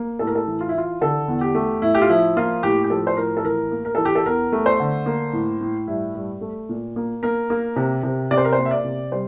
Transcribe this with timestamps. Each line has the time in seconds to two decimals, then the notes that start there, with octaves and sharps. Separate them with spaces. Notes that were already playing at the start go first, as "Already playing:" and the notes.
Already playing: A#3
0.19 A2 A4
0.27 A#4
0.35 A4
0.47 E3
0.61 F4
0.69 E4
0.74 E3 F4
1.01 D3 A4
1.28 E2
1.41 G4
1.55 A3
1.82 A2 E4
1.95 G4
2.02 F4
2.10 F3 E4
2.37 A#3 F4
2.63 A2 G4
2.84 G4
2.90 F3 A4
3.07 C5
3.17 A2 A#4
3.37 A4
3.44 E3 A#4
3.71 A#3
3.85 A#4
3.95 E3 A4
4.05 G4
4.15 A4
4.26 E2 A#4
4.52 A3
4.66 C5
4.80 D3
5.06 A#3
5.33 A2
5.61 A2
5.87 G2 E4
6.15 G2
6.41 A3
6.69 A#2
6.96 A#3
7.23 A#3 A#4
7.50 A#3
7.76 C3
8.03 C3
8.31 C3 D5
8.37 C5
8.45 A#4
8.52 C5
8.58 A#3
8.65 E5
8.71 D5
8.84 C3
9.12 G3 C5